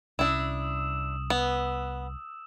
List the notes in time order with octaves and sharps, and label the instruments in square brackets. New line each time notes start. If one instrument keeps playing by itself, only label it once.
[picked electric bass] C2 C#4 [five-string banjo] D4 E4 [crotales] D#6 E6 E7
[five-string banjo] B3